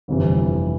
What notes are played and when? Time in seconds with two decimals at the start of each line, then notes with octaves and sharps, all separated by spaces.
0.08 G1 F2 C3 E3